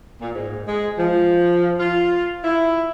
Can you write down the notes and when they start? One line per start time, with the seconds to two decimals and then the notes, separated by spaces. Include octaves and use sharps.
0.21 A#2
0.33 G#2
0.67 G#3
0.98 F3
1.80 F4
2.44 E4